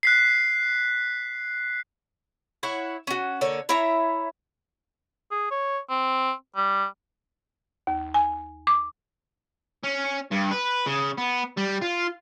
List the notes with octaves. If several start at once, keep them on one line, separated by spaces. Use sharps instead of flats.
F#6 B6 C7
E4 C#5 F#5
C#4 F#4
D3 A#3 C#5
E4 C#5 E5 A#5
G#4
C#5
C4
G3
D#2
G#5
D6
C#4
G2
B4
C#3
B3
G3
F4